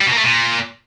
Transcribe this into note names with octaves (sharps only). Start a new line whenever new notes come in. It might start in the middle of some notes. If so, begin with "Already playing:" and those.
G3
B2
A#3
A3
A#2